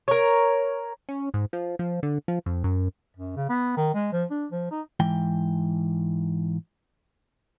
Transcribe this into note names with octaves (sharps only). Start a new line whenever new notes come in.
A#4 C#5
C#4
G#2
F3
F3
D3
F3
F2
F#2
F#2
C#3
B3
D#3
G#3
F3
D4
F3
D#4
G#2 E3 G5